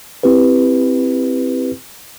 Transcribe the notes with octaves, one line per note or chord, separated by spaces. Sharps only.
C4 E4 G4 B4